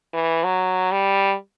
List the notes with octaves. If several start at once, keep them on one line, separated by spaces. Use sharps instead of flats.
E3
F#3
G3